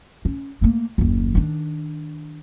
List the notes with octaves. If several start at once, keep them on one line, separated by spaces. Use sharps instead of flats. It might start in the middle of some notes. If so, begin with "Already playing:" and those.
C#4
A3 A#3
F#1 D#2
D#3 D4